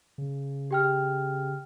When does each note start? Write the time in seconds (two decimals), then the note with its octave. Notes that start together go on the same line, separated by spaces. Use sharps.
0.18 C#3
0.71 G4 G5 F6